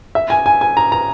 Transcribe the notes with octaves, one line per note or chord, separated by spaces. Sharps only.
E5
G#5
G#5
G#5
A#5
A#5